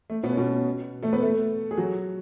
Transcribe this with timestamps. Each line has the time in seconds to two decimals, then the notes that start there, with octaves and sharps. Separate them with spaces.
0.10 A3
0.23 B2 B3
0.32 C#4
0.37 B2 B3
1.03 A3 A4
1.13 B3 B4
1.22 A3 A4
1.71 G#4
1.77 F#3 F#4